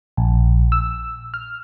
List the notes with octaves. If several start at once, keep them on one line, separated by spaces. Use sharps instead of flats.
A#1
E6
F6